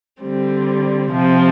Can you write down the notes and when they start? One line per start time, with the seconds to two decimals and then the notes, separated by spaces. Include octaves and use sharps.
0.22 D3 G3 C4
1.11 C3 F3 C4